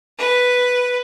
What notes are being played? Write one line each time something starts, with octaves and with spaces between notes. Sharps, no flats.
B4